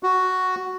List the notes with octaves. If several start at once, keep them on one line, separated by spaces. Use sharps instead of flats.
F#4